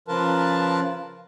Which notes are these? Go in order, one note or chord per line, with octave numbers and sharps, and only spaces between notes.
C#3 F3 F4 A#4 B4 A5